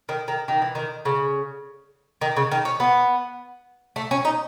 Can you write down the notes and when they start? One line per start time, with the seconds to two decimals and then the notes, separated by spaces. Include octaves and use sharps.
0.09 D#3
0.28 D#3
0.48 D#3
0.62 E3
0.75 D#3
1.05 C#3
2.21 D#3
2.36 C#3
2.51 D#3
2.65 C#4
2.80 B3
3.96 A3
4.11 C#4
4.25 D#4